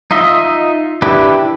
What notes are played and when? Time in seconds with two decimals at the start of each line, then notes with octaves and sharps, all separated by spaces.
0.11 D#4 F4 D#5 E5
1.02 D4 E4 G4 B4